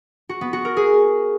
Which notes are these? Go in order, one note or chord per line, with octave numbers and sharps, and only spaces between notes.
F#4
B3
F#4
A#4
G#4